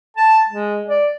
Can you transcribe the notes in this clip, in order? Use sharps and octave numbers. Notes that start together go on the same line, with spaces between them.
A5
G#3
D5